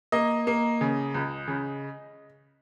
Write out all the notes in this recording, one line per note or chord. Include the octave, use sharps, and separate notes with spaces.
A#3 D#5
A#3
C#3
C#2
C#3